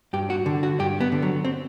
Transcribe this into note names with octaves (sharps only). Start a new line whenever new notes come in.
G2 G4
F#4
D3
F#4
G2 G4
B3
D3
F#3
C4